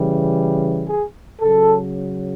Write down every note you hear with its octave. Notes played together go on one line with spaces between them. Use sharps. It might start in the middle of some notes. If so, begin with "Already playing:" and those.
Already playing: C#3 E3 G3
G#4
C#3 F#3 A4